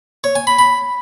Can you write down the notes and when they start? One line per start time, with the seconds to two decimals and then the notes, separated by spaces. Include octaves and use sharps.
0.24 C#5
0.35 G#5
0.47 B5
0.59 B5